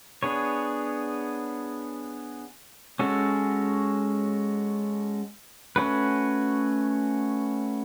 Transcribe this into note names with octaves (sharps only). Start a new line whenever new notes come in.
B3 D4 G#4 C#5
G#3 C#4 F#4 A4
A3 C#4 F#4 B4